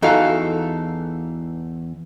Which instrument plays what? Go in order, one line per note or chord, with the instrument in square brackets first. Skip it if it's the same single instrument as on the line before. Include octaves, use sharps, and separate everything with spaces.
[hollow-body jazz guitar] E2 [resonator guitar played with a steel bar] E3 D#4 A4 [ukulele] F#4 F5 A#5